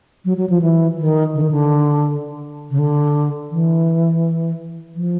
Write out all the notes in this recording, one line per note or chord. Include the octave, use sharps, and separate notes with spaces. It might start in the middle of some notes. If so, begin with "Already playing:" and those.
F#3
F#3
F3
E3
D#3
D3
D#3
D3
C#3
D3
E3
F3